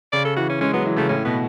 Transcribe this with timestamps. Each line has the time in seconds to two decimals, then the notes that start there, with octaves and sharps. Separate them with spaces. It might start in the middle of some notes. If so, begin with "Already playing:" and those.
0.12 C#3 D5
0.25 A4
0.36 E3 F#4
0.49 C#4
0.61 G#3 C#4
0.73 F#3 B3
0.86 E3
0.96 C#3 A3
1.09 A2 C#4
1.25 B2 B3